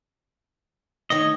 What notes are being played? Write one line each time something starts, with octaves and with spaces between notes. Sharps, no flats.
D2 D#3 C#5 D#5